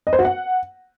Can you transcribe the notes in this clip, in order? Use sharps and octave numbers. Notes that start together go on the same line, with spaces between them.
D#5
C5
F#4
F#5